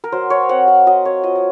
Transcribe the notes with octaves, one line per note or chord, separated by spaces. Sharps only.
A#4
F#3 C5
C#5
C4 F#5
F5
F#3 D#5
C#5
F4 D#5
D#5